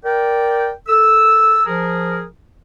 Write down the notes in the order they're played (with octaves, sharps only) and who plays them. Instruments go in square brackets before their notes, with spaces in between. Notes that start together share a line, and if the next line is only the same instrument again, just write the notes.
[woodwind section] A#4 D5 G5
A4 E6
F3 G#4 A#4